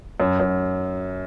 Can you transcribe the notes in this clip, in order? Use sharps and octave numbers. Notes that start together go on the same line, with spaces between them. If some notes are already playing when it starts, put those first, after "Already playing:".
F#2
F#2